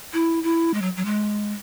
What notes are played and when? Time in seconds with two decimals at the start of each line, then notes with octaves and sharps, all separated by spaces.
0.13 E4
0.43 E4
0.74 G#3
0.82 F#3
0.97 F#3
1.05 G#3